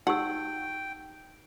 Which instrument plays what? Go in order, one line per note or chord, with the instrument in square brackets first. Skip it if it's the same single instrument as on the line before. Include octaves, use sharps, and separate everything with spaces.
[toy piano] D#4 G4 E6 [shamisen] F#5 [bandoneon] G5